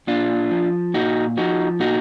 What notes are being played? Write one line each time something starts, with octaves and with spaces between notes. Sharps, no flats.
A#2 D4 F4
F3
A#2 D#4 F#4
F3 D#4 F#4
A#2 D#4 F#4